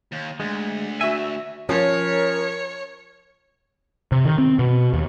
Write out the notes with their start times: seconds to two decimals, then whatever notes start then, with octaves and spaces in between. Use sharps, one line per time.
0.12 D#2
0.40 D2 G#3
1.01 F#4 E5 G#5
1.69 F3 C#4 A#4 C#5
4.12 C3
4.25 D#3
4.38 C4
4.59 B2
4.93 D#2